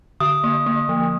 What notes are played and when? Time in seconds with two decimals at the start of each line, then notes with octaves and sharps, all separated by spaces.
0.20 D3 D#6
0.44 A#3
0.66 A#3
0.89 F3